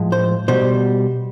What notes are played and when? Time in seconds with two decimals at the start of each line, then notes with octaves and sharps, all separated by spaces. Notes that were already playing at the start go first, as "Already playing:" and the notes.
Already playing: A2 F3 G#3
0.12 C5
0.48 B2 G3 C5